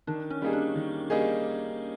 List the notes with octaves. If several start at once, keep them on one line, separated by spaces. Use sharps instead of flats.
D#3 D4
C#4
G3 A#3 D#4 G#4
D4
D#3
G3 A#3 D#4 G#4